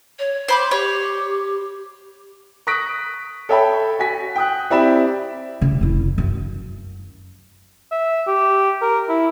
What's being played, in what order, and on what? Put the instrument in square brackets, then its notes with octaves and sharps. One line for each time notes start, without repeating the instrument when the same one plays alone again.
[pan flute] C#5
[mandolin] C5 B5 D6
[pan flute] G4 [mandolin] C#5
[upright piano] C#6 D#6 F#6 A#6 B6 D7
A4 C#5 E5 G5 A5 B5
F#4 G#5 B6
G5 D#6 F#6
C4 E4 G4 D5 B5 E7
[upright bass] C#3
F1 E4
F#2
[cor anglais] E5
G4
A#4
E4